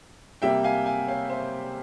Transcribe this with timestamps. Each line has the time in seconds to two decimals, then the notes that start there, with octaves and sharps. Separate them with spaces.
0.42 C3 G3 A#3 E5 G5
0.64 F5 G#5
0.86 F5 G#5
1.08 C#5 F5
1.30 C5 E5